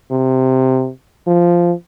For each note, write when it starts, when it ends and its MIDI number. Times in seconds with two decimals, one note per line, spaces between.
0.11 0.90 48
1.27 1.72 53